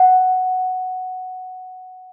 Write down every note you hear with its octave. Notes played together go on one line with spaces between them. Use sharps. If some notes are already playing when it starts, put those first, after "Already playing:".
Already playing: F#5